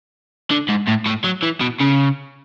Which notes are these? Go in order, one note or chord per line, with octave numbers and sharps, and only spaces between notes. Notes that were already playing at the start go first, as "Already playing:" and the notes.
D3
G#2
A2
A2
F#3
E3
B2
C#3